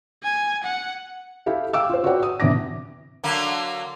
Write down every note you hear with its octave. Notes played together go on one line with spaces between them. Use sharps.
G#5
F#5
E4 G4 A4 F5
F5 G5 D6 E6
F4 C5
F#4 B4 C#5 D5 F#5 G5
D#6
C3 E3 D4 D6 A#6
D3 F#3 A#3